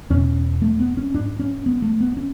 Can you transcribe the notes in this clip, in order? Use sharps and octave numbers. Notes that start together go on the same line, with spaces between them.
E2 B2 C#4
A3
B3
C#4
G#2 D4
C#4
B3
A3
B3
C#4